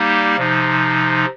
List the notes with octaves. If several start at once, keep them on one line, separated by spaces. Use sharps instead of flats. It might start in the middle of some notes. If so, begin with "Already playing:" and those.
Already playing: G3 A#3 D#4 G4
C3 F3 D#4